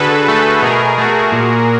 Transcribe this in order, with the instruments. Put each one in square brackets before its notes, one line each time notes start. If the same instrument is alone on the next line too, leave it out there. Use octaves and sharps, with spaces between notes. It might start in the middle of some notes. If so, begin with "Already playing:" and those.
Already playing: [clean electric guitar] D3 [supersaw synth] F#4 G#4 A4 B4
[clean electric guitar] A3 [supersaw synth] A4 B4
[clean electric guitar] B2 [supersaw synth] G#4 A#4
[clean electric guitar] A3 [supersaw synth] F#4 G#4
[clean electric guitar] A#2